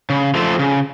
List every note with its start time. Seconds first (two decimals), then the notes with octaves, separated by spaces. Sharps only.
0.10 C#3
0.35 F3 A3 F4 A4
0.59 C#3